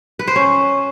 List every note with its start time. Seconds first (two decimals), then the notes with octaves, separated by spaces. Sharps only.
0.19 B4
0.28 C5
0.36 C#4